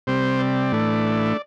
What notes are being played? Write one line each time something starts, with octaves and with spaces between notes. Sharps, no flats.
C3 G3 C4 C5
D5
A2 E3 A3 D4